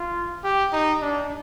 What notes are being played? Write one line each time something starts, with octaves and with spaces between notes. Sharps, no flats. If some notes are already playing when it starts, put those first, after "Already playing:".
Already playing: F4
G4
D#4
D4